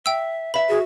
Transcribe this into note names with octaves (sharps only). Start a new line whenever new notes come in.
E5 G5 E6
B4 E5 B5
F#4 G#4